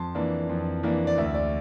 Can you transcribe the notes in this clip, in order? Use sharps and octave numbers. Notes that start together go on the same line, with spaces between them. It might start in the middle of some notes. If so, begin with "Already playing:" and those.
Already playing: F2 A5 C6
E3 A#3 D4
F2
E3 A#3 D4
D5
D2 E5
D5